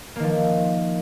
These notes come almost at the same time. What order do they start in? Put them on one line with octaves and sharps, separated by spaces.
A#3 D#3 F3